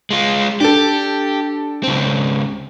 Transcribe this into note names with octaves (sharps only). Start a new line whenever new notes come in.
G#3 F4
D4 G4 A4
C#2 C4